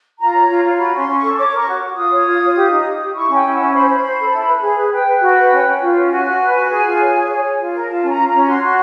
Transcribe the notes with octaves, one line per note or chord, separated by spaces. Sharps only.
F4 A#5
C#5
F4
F4
F#4 B5
C#4 C6
C#4
C#6
A4
C#5 D6
A#4 C#6
F#4
F#4
F4 D#6
C#5
F4
F4
G4
D#4
G4
G4
E4 C#6
C#4 G5
E4
C#4 F#5
C5 B5
C5
C5
A4
E4
B4
G#4
B4
B4 G5
B4
F#4
B4
C#4
C#4
F4
C#4
F#4 G#5
F#4
B4
F#4
G#4
F4
C#5
G#4
C#5
C#5
F4
A#4
F4 A5
C#4
A#5
F4
A#5
C#4
F#4 C6
F#4